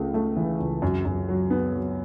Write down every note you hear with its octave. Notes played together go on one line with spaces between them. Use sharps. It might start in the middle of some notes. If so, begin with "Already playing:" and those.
Already playing: C#2 C#3 A3
A3
E3
C#2
F#2
F#2
F#3
B3
F#3